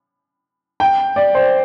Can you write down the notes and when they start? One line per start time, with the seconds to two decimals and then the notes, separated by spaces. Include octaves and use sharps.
0.80 G5
1.16 D5
1.35 C5